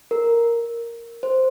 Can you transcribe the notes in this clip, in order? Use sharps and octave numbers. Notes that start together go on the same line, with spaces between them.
A#4
C5